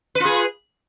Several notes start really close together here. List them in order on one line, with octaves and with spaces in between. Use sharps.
B4 F4 G#4